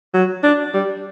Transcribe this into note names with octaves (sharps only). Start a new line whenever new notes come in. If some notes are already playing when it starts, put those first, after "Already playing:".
F#3
D4
G3